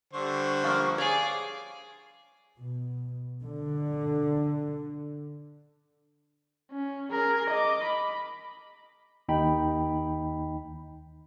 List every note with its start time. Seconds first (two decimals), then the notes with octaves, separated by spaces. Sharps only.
0.13 D3 G3 C5 C#6
0.64 F3 A#3
0.98 G#4 C#5 D5 F5
2.60 B2
3.43 D3
6.72 C#4
7.12 G#4 A#4
7.50 D#5 D6
7.84 B5
9.28 D#2 D#4 G5 B5